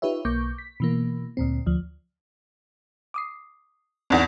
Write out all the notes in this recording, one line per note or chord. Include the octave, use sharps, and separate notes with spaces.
D#4 F4 G4 B4 C#5 E5
B1 A#3 C#6 D6 G6
B6
B2 E3 A#3
D2 A#2 C4
D2 F3
D6 D#6 C7
G1 E2 C4 D#4 F#5